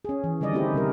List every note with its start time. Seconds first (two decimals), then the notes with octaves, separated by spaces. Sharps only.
0.05 C#4 G#4
0.24 E3
0.41 D3 D#3 G3 D5 D#5
0.53 A3 C4 D#4 E4 G4 G#4
0.74 C3 G3 A#4